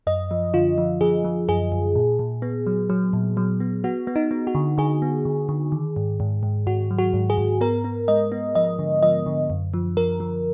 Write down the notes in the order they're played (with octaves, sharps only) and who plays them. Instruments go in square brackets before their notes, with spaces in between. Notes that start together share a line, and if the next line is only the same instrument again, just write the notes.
[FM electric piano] F#2 D#5
F3
D3 F4
F3
F3 G#4
F3
F#2 G#4
F#2
A#2
A#2
B3
F#3
F#3
A#2
F#3
B3
B3 F#4
B3
D#4
B3
F#4
D3
D3 G#4
B3
D3
D3
D#3
G#2
G#2
G#2
G#2 F#4
F#3
F#4
G#2
G#4
G#2
B3 A#4
B3
G#3 D#5
B3
F3 D#5
D3
F3 D#5
D3
F#2
F3
F3 A#4
F3